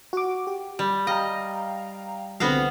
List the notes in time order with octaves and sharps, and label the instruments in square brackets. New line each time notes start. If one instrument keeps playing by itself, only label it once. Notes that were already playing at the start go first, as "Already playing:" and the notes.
[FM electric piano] F#4 D6
G4
[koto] G3
[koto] D#5 [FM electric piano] F5 G5 A#5
[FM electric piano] C2 D3 C4 [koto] B3 F#4 F5